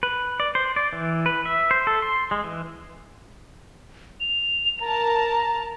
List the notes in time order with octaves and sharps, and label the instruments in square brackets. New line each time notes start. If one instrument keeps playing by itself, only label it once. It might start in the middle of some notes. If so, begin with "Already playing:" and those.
[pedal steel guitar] B4
D5
C5
D5
E3
B4
E5
C5
A4
C6
G#3
E3
[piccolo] F7
[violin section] A#4 A5 [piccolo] A#5